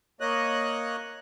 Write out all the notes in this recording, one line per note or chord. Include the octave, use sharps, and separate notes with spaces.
A#3 C#5 D#5 F#6